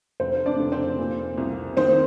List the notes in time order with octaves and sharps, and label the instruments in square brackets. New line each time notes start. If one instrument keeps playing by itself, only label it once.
[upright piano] F1 C4 C5
D4 D5
F1
C4 C5
A#2
C2
D#3 C4 C5